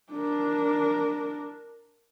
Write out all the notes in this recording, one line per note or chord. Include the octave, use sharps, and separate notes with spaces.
D4 A#4